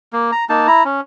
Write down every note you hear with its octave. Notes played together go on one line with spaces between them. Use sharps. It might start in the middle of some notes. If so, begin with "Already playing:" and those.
A#3
A#5
A#3 D#4 A5
E4 A#5
C#4